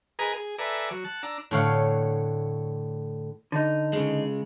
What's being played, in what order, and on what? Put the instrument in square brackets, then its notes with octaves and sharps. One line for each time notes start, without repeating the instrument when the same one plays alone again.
[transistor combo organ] G#4 A#4 B4 D#5 G#5 A#5
G#4
A4 B4 D5 E5 G#5 A#5
F#3
F#5 A5
D4 A#5 E6
[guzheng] A2 D3 C#5 F5 F#5
[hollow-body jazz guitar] D3 D#4
[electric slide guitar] C#3 G#3